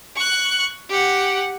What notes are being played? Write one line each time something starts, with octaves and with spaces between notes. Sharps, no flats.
C#6 F#6
G4 F#5